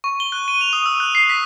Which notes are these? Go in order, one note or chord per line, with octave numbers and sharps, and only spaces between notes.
C#6
G7
F#6
D#7
F7
D#6
E6
F#6
C7
B6